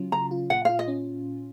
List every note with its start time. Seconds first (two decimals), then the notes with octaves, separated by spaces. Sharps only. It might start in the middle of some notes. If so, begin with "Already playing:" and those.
Already playing: C#3 F#3 C#4 F4
0.12 C#3 A#5
0.31 F4
0.50 A#2 F#5
0.65 F4 F5
0.79 D#5
0.88 C#4